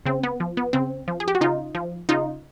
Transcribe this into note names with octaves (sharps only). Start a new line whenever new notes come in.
C#3 C4
B3
F3
B3
C#3 C4
F3
G#4
G4
F#4
C#3 D#4 F4
F3
C#3 D#4 F4